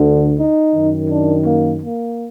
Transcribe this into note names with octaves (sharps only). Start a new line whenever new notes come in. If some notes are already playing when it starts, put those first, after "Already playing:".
Already playing: D2 D3
D#4
F#2 D#3
D4
A#3
A#3